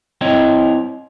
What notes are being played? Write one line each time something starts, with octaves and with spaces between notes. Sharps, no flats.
C4 E4 C#5 D#5 G5